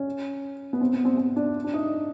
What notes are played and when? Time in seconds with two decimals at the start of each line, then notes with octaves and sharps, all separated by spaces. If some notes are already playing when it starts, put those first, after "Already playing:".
Already playing: C#4
0.73 B3
0.81 C4
0.93 B3
1.05 C4
1.17 C4
1.36 D4
1.64 D4
1.74 D#4